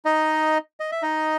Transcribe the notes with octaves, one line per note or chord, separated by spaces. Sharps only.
D#4 D#5
D#5
E5
D#4 D#5